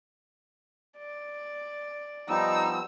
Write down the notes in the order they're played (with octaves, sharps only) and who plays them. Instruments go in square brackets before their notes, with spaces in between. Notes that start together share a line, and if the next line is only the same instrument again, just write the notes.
[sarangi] D5
[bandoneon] F3 G3 B3 [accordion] D#4 [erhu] E6